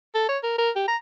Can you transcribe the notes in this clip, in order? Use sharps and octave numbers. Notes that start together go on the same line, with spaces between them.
A4
C#5
A#4
A#4
G4
A#5